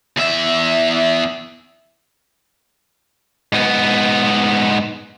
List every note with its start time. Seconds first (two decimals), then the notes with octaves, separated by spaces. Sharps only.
0.17 E2 E5
3.52 G#2 B3